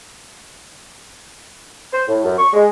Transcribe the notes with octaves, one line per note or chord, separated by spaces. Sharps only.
C5
A2
F#2
C#6
G#3